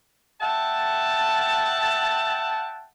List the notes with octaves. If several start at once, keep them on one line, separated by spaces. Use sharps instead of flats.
E5 F#5 G5 A5